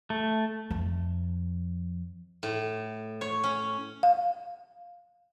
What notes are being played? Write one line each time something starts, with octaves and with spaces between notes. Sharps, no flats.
A3
F2
A2
C#5
C#4
F5